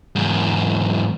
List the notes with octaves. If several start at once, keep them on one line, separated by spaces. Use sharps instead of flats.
E2 G#2